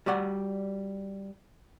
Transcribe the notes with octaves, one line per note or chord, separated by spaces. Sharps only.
G3 F#4 D5 F#5